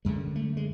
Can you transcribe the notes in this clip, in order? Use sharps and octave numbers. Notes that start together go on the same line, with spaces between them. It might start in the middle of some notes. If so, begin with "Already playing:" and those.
F#2 D3 G#3
A3
G#3